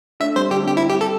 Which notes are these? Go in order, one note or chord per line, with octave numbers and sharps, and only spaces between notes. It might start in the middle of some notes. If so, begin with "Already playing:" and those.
A3 D4 E5
G3 C4 C5
D3 G3 G4
D4
G3 C4 G4
E4
G4
A4